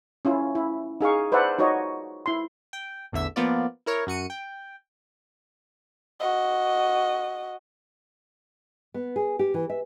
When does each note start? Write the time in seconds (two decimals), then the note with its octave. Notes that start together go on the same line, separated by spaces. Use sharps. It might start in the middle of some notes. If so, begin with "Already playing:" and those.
0.25 C#4 E4 F4
0.55 E4
1.01 D#4 G#4 F5 C#6
1.32 B4 C5 D5 E5 F#5 A5
1.59 D#4 F4 F#4 C#5 D#5
2.26 E4 C6
2.73 G5
3.12 A1 E2 D3 E5 E6
3.36 F3 A#3 B3 F4 D5
3.86 E4 A#4 C#5
4.07 F#2 F#4 C#7 D#7
4.30 G5
6.20 F#4 D#5
8.94 B3
9.16 G#4
9.39 G4
9.54 E3
9.70 E5